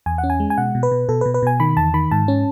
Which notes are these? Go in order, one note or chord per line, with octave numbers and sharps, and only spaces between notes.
E2 G#5
F#5
C#4
G#5
G#3
G#5
B2 F#5
B2
B4
B2
B2 A4
B4
B2
B4
B2 G#5
D#3 B5
E2 A5
D#3 B5
G#2 A5
C#4